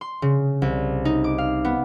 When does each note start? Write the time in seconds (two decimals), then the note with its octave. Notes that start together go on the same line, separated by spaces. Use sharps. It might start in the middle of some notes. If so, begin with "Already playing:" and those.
0.01 C6
0.22 C#3
0.62 C2
1.05 D#4
1.24 D6
1.38 F5
1.65 B3